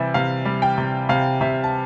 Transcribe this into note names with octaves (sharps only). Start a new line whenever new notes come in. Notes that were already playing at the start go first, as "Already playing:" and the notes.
Already playing: C3 E3 G3 E5
C3 F5
G3
G5
C3
C3 F5
C3 E5
A5